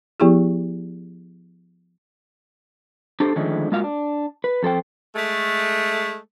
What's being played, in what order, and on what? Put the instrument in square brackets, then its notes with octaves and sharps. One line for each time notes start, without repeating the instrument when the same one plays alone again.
[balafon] F3 B3 E4 G4 G#4
[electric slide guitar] D4 G4 A4 C5
D3 D#3 F3 G#3 A3 C#4
G#3 A#3 F4 F#4 F5
D4
B4
F2 A4 C5 G5
[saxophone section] G#3 A3